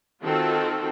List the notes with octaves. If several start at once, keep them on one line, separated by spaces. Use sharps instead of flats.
D#3 C4 F4 F#4 A4